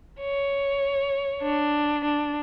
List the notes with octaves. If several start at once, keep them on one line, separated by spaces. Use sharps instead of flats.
C#5
D4
D4